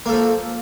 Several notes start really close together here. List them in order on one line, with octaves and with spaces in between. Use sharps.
A#3 A4 F3